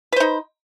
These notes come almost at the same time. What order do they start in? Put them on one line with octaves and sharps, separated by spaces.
B4 C5 D#4